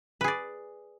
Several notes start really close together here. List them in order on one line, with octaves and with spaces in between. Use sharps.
B4 G#4 D5